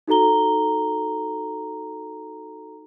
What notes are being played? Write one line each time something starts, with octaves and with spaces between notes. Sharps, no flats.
D#4 F#4 A4 A#5 G7